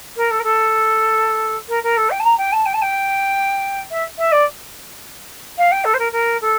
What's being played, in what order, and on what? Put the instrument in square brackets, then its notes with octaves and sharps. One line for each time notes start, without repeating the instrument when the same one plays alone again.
[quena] A#4
A4
A#4
A4
A#4
A#4
A4
G5
A5
A#5
G5
A5
G5
A5
G5
E5
E5
D5
F5
G5
A4
C5
A#4
A#4
A4